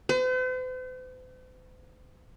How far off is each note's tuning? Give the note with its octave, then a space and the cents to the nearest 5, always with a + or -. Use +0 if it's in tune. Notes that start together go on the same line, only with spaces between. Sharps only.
C5 -45